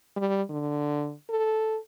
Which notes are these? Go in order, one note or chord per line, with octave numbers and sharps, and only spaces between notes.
G3
D3
A4